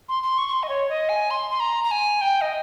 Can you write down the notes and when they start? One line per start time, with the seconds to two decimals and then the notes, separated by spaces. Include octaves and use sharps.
0.09 C6
0.23 C6
0.38 C#6
0.48 C#6
0.53 C6
0.63 D#5
0.69 C#5
0.90 D#5
1.09 G#5
1.31 C6
1.51 C6
1.60 A#5
1.84 A#5
1.91 G#5
2.21 G5
2.41 D#5